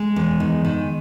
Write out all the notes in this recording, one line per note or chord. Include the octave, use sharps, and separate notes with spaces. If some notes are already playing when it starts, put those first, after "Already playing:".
Already playing: G#3
E2
D#3
D#3